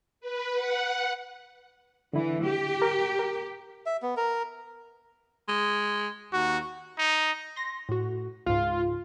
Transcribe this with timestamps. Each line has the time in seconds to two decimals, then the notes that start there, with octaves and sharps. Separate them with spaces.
0.21 B4
0.53 F#5
2.13 D3 E3 E4
2.43 G4
2.82 A#4
3.19 A#4
3.86 E5
4.02 B3
4.17 A#4
5.48 G#3
6.33 D#2 F#4
6.99 D#4
7.56 C6 A#6
7.89 A2 F#4
8.46 C#2 G#2 F4